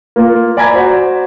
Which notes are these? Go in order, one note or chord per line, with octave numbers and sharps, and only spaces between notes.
A#3 F4
D5 G#5 A#5 B5 G#6 B6
F#4 C5 D5